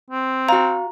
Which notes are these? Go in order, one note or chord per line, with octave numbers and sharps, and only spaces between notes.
C4
F#4 F5 A#5